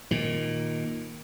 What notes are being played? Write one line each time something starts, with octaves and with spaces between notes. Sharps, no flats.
A#2 D#3